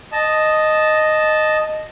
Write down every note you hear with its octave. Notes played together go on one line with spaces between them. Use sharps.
D#5 A5